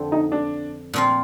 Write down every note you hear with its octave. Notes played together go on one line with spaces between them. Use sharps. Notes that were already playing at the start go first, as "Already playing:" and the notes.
Already playing: F2 D3 F3 C4
D#4
D4
A#2 F3 C4 F4